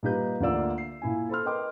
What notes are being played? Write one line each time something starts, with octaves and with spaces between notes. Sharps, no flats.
A#2 G3 D#4 G4 B4 G6
D2 D3 A#3 F4 D5 E6
C7
A#2 E4 G#5
A4 C5 B5 C6 F6
A#4 B4 D#5 G5 C6 D6